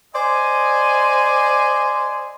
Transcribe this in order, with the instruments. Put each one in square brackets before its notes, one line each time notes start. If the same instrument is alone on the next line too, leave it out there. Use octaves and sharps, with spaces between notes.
[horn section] C5 D5 D#5 G#5